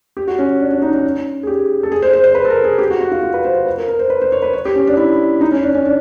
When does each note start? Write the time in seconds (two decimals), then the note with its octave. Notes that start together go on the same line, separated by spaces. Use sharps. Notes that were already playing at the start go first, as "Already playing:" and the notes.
0.17 G4
0.28 F#4
0.38 C#4
0.60 D4
0.71 D4
0.82 D#4
0.94 C#4
1.43 G#4
1.47 G4
1.83 A4
1.92 G#4
2.02 C5
2.13 C5
2.24 C5
2.35 B4
2.45 A4
2.50 A#4
2.64 G#4
2.78 G4
2.90 F#4
3.01 F#4
3.12 F4
3.23 F4
3.34 B4
3.45 C5
3.66 B4
3.78 A#4
3.88 A#4
3.99 C5
4.10 B4
4.22 C5
4.32 C#5
4.42 B4
4.53 C#5
4.65 G4
4.75 C#4
4.87 D4
4.97 E4
5.41 D#4
5.52 C#4
5.63 D4
5.74 C#4
5.85 D4